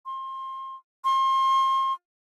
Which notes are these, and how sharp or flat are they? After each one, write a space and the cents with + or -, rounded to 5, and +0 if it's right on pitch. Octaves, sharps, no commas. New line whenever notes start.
C6 +30
C6 +35